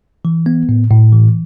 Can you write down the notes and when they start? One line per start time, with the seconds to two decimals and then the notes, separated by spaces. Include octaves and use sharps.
0.25 E3
0.46 B3
0.69 A2
0.91 A2
1.13 E3